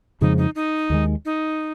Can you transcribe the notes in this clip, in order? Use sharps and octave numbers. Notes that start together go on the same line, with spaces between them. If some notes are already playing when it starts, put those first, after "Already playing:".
F2 C#3 F3 G#3 D#4
D#4
D#4
D#2 D#3 G#3
D#4